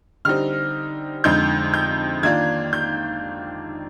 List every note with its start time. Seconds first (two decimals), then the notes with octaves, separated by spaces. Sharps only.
0.25 D3 G3 C4 D#4 F6
1.24 F2 D3 G#3 D#4 G6
1.74 G6
2.23 D#3 A#3 D4 F4 G#6
2.73 G6